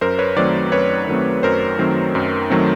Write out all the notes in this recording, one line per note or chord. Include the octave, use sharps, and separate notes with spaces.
F#2 A#4 C5
B4 C#5
D#3 F#3 A3 C4 C5 D5
F#2 B4 C#5
D#3 F#3 A3 C4
F#2 A#4 C5
D#3 F#3 A3 C4
F#2
D#3 F#3 A3 C4